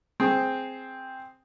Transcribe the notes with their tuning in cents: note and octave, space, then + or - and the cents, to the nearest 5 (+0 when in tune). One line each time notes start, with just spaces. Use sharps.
C4 +0 G#4 +5